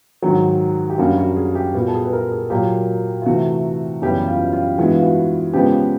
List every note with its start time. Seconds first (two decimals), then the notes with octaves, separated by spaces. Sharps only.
0.22 G#2 D#3 F#3 F#4
0.90 G4
0.98 F#2 D3 G3 A#3 F#4
1.18 F#4
1.36 G#4
1.55 G4
1.74 A#2 G3 B3 F#4
1.88 A4
1.94 G#4
2.05 B4
2.13 A#4
2.31 G#4
2.50 A#2 F#3 A#3 G4
3.22 F4
3.26 C3 E3 A3 F#4
4.02 F#2 C#3 E3 G3 B3 G4
4.27 F4
4.53 F4
4.78 G2 E3 G#3 B3 F#4
4.93 F4
5.03 F#4
5.53 C#3 F3 G#3 B3 G4